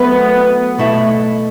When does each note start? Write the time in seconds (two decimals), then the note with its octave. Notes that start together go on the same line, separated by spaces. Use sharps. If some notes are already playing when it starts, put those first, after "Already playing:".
Already playing: F#3 A3 B3 E4
0.78 B2 A3 E4 A4 E5